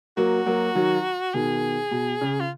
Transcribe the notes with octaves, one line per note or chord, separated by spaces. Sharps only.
F#3 A#3 F#4
F#3 A#3
D#3 F#3
B2 D#3 G#4
B2
C#3
F4